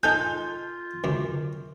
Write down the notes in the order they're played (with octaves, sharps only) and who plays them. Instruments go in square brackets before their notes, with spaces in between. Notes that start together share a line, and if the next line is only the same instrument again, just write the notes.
[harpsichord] D#4 A4 G#5 [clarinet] F4 [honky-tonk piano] G6
[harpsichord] C#2 F#2 [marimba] D3